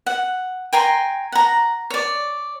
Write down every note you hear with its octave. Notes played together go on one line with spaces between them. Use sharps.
F#5
G5 G#5 A#5 C6
F#5 A#5
C#5 D5